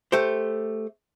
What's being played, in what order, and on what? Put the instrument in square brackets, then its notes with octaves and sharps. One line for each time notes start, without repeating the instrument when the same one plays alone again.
[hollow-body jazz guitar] A3 G4 C5